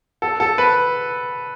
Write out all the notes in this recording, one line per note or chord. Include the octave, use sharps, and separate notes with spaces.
A4
A4
B4